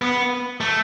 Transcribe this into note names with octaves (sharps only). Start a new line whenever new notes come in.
B3
A3